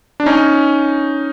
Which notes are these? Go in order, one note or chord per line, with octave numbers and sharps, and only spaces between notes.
D4
C#4 D#4